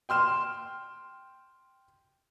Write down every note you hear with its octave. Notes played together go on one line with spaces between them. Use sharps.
G5 C6 F6 E7